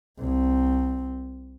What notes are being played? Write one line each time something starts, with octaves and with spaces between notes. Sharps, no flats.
C2 C4